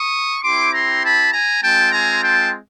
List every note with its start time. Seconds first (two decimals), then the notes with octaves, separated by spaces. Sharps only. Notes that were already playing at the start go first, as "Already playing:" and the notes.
Already playing: C#6 D#6
0.43 C4 E4 G4 C6 D6
0.73 A#5 C6
1.03 A5 B5
1.32 G#5 A#5
1.63 G#3 C4 F4 G5 A5
1.92 G#5 A#5
2.22 G5 A5